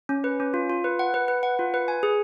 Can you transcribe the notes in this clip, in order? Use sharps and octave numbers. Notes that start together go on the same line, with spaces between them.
C#4
B4
C#4
F4
F4
B4
F#5
B4
B4
F#5
F4
B4
G#5
G#4